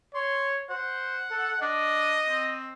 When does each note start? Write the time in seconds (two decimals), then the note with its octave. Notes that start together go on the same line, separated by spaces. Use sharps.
0.15 C#5 C6
0.70 C5 F#5
1.31 A4
1.61 D4 D#5
2.29 C4